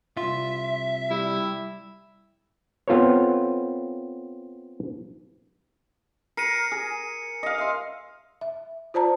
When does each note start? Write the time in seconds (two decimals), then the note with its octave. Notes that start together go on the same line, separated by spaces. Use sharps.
0.17 C2 F4 E5
1.10 G3 E4
2.88 B3 C4 F4 A4 B4 C#5
6.37 A#4 C7 C#7 D#7
6.72 G#4
7.43 D#5 F5
7.58 E5 C6
8.41 E5
8.94 F4 C5 D5 A5 A#5